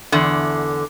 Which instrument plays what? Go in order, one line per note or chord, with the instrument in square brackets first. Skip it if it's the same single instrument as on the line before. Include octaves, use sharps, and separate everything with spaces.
[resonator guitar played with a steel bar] E2 D3